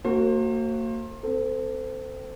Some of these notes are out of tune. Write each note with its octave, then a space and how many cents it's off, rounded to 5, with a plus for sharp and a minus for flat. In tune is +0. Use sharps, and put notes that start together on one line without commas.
A#3 -35 F#4 +5 C5 +30
C4 -25 A4 +15